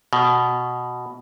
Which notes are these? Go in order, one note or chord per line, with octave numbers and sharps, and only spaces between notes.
B2